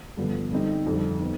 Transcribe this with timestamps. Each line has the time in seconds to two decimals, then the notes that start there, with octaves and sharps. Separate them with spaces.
0.17 G2 D3 F3 B3
0.51 D3 G3 C4 D#4
0.86 F2 D3 G3
1.20 B3 D#4